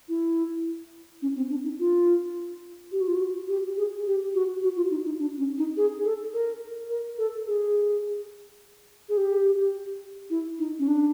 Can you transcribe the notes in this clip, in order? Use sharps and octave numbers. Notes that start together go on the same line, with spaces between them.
E4
C#4
C4
D4
D#4
F4
G4
F#4
F4
F#4
G4
G#4
G4
F#4
F#4
F4
D#4
D#4
D4
C#4
D#4
G#4
A4
A#4
A#4
A4
G#4
G#4
G4
E4
D#4
C#4
D4